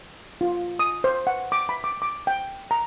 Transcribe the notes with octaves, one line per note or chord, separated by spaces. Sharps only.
F4
D#6
C5
F#5
D6
B5
D6
D6
G5
A#5